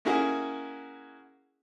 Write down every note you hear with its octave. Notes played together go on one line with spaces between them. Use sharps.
A#3 C#4 E4 F#4 G#4